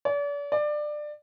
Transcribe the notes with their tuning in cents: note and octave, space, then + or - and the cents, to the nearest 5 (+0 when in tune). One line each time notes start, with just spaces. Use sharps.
D5 -40
D5 +20